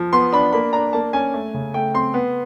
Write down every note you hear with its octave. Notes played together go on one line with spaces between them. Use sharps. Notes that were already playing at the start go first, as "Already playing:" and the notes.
Already playing: F3
B3 C6
D4 B5
A#3 B5
D4 A#5
A#3 A5
C#4 G#5
A3
C#3
A3 G5
C4 C6
B3